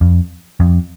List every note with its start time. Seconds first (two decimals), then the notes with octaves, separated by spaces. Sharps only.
0.01 F2
0.60 F2